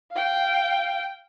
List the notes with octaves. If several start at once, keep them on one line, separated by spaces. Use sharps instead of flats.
F5 G5